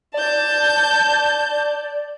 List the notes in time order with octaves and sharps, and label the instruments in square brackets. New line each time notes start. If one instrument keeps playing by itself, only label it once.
[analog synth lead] D5 [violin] A5 G6